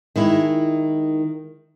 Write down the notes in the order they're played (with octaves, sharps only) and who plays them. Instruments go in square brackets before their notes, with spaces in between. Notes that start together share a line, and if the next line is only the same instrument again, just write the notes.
[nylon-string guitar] D#3 G#3 E4